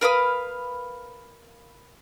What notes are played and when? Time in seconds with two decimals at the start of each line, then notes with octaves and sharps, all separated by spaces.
0.01 A#4 B4 F5 D#6